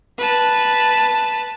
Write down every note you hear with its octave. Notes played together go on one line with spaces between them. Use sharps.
B4 A5